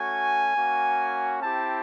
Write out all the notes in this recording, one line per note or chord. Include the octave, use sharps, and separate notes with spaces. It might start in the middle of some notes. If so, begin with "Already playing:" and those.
Already playing: A3 C#4 F#4 G#5
A#3 C#4 F#4
C4 E4 G4 A5